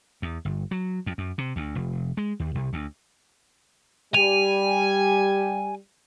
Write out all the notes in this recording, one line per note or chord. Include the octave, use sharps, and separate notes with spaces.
E2
G1
F#3
F2
F#2
C3
D2
F1
G#3
D#2
C2
D2
G3 G4 G#5 D#7 F7